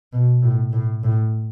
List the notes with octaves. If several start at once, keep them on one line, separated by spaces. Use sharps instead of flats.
B2
A2
A2
A2